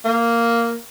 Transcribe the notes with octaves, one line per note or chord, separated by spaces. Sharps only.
A#3